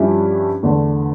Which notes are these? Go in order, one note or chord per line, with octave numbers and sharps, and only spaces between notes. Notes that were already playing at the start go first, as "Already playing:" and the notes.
Already playing: G2 F3 C#4 E4 G4
E2 D3 A3